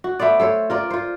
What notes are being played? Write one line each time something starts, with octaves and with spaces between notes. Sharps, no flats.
F#4
A3 B3 C5 D5
A4 C5 C#5
F4 A#4 D5
F4 C5